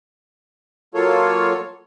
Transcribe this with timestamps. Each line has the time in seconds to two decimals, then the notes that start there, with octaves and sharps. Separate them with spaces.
0.94 F#3 A#3 F4 A4 C#5